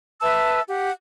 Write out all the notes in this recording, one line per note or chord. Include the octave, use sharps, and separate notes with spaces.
B4 E5 A5 E6
G4 F#5